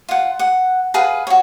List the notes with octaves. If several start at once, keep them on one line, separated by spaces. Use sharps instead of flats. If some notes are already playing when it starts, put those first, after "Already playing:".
F4 F#5
F#5
G#4 B4 F5 F#5
F#4 C#5